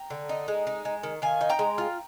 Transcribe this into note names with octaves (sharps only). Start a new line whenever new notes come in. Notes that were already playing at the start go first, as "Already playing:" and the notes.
Already playing: G5 A#5
D3
D#4
G#3
D#4
G#3
D#3
D#3 F5 G#5
D#4
G5 A#5
G#3
F4